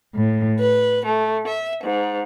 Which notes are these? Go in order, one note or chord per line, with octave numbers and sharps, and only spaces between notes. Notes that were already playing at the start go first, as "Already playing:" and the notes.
A2
B4
A3
E5
G#2